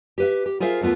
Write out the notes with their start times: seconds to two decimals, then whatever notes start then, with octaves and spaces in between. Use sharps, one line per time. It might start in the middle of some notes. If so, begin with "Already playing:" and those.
0.18 G4 B4 E5
0.46 G4
0.60 F4 G#4 A#4 C5 E5 F5
0.81 D#2 A3 B3 F4 E5